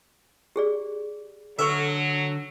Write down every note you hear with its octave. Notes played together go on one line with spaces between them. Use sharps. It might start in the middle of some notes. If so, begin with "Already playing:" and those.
G4 G#4 D5
D3 F#3 A4 B4 E5 C#6